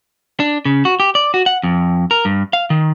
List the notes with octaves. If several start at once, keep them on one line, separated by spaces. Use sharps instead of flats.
D4
C#3
F#4
G4
D5
F#4
F#5
F2
A#4
G2
F5
D#3